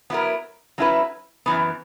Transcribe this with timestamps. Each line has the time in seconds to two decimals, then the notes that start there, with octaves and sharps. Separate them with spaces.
0.10 F#3 B3 E4 A#4
0.78 F#3 C#4 E4 B4
1.46 F#2 E3 B3